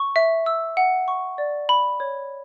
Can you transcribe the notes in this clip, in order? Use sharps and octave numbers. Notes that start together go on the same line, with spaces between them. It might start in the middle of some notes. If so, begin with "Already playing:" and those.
Already playing: C#6
E5
E6
F#5
C#6
D5
B5
C#5